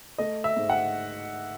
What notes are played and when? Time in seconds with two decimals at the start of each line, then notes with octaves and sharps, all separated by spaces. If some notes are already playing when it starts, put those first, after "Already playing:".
0.18 A3 D#5
0.44 E5
0.56 G#2
0.70 F#5